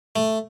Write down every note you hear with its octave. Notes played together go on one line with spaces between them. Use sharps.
A3